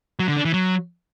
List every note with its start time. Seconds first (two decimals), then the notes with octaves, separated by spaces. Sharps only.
0.20 F#3
0.28 D3
0.37 D4
0.45 E3
0.54 F#3